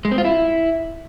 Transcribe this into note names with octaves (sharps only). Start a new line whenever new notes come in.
G#3
C4
F4
E4